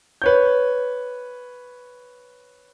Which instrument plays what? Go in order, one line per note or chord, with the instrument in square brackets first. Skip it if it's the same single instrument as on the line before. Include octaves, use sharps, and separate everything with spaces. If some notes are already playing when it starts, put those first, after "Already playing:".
[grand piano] B4 C#5 G6